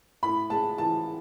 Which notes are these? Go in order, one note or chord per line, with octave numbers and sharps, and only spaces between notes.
A2 B5
G#3 A5
E3 A5